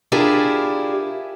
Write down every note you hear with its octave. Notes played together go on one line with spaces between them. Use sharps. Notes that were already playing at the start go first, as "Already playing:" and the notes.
D4 E4 F4 G4 G#4 A#4